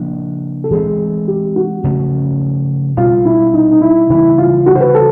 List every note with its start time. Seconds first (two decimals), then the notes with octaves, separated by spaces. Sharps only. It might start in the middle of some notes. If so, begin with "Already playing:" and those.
Already playing: C#3 F3 A#3 D4
0.64 A4
0.71 E3 G#3 C4 G#4
1.28 G4
1.56 F#4
1.84 C#3 F3 A3 C#4
2.97 B2 G3 C4 F4
3.25 E4
3.54 D#4
3.71 D#4
3.81 E4
4.10 C#3 E3 G3 A#3 E4
4.38 F4
4.66 F#4
4.75 C5
4.81 B4
4.95 A4